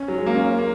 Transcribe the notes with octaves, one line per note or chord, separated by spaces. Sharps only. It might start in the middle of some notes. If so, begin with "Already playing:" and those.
Already playing: C#4
F#3
G#3
A#3
C#4
A#3